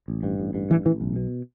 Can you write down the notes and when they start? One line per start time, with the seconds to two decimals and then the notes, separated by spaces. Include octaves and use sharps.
0.08 A1
0.23 G2
0.40 A1
0.55 G2
0.70 A1 E3
0.85 A1 E3
1.01 B1
1.16 B2